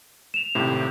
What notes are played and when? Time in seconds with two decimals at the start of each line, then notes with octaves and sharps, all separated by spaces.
0.34 E7 F7
0.55 G#1 A2 C3